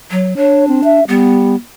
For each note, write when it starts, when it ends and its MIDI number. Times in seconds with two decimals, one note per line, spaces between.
0.11 0.36 54
0.37 1.00 62
0.37 0.68 73
0.68 0.81 60
0.84 1.04 76
1.08 1.56 55
1.08 1.55 59